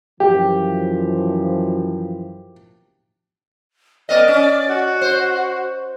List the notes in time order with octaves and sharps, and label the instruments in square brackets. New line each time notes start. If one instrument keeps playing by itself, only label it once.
[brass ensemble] F#2 E3 F3 [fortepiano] G4
[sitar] B3 A#4 D#5 [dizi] D5
[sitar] C#4
[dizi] F#4
[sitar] C5